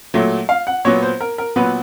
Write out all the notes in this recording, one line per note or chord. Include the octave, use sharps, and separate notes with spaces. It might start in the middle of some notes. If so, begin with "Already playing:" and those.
A#2 F#3 A3
F5
F#5
A#2 F#3 B3 C#5
C5
A#4
A#4
A#2 F#3 B3 B4